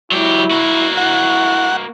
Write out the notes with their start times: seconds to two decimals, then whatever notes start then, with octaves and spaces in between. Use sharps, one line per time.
0.12 F#3 E4 G4
0.51 A#3 F#4
0.97 E4 F#5